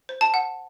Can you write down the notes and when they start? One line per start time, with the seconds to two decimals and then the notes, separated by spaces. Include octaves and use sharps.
0.09 C5
0.21 A5
0.34 F#5